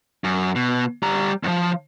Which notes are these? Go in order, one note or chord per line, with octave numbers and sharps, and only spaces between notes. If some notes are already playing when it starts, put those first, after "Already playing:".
F#2
B2
G3 A#5
E2 F3